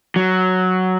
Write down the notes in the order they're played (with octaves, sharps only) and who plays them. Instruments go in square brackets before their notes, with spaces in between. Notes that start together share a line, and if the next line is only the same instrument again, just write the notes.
[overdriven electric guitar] F#3